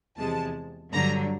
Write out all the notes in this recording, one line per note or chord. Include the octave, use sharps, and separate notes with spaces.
E2 C3 F3 G#3 A5
G2 D3 F#3 A#5